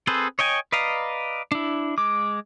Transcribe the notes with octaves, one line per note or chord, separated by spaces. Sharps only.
C4 G#4 A4 B4 C5
C#5 D#5 G5 G#5
B4 D5 D#5 F5 A#5
D4 E4
G#3 D6